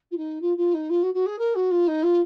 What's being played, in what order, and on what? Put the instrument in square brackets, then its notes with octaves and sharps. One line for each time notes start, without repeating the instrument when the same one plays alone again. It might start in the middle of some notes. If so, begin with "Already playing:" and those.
[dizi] F4
D#4
F4
F4
D#4
F4
F#4
F#4
G#4
A#4
F#4
F4
D#4
F4